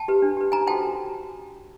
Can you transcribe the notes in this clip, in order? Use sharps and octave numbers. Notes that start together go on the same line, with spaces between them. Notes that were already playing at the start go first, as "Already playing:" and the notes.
Already playing: G5 A5
G4 B4
D4
G4 B4
D#4 G#5 A#5
F#4 A4 C5 G5 A5